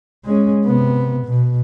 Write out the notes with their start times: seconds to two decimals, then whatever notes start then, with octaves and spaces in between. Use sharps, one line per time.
0.24 G#3 C#4
0.65 C3 B3
1.25 B2